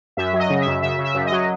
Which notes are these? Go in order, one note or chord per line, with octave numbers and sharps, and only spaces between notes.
F#2 E5
F#3
D#5
C#3
E5
F#2
C#3 E5
C#3
E5
F#2
D#5
F#3